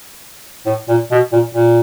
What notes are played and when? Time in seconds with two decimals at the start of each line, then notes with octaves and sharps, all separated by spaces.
0.66 A2
0.88 A#2
1.11 B2
1.32 A#2
1.54 A#2